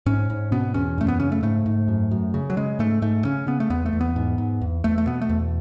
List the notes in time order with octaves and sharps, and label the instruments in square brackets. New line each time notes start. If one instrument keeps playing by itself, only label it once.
[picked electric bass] G#2 C#4
G#2
B2 B3
E2 C#4
F#2 A3
B3
C#3 C#4
A3
G#2 A3
G#2
F#2
F#2
C#3
F#3
C#3 G#3
G#2 A3
G#2 A3
C#3 C#4
C#3 B3
A3
E2 B3
A3
E2
B3
G#2
G#2
E2
E2 A3
A3
B2 B3
A3
E2